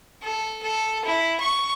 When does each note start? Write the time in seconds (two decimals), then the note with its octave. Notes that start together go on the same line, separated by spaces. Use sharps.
0.23 A4
0.63 A4
1.05 E4
1.40 C#6